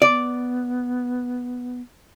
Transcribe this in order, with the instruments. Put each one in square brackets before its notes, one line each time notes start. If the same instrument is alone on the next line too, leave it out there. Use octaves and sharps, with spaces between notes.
[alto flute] B3 [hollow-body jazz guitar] D5